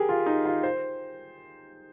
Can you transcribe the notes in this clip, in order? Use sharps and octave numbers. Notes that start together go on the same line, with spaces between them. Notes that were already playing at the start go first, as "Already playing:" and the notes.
Already playing: G4 G#4 A#4
F4
D#4
F4
C5